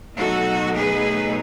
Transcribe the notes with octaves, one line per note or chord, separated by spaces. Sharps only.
B2 F#3 A3 D#4 F#4 A4
G#4 B4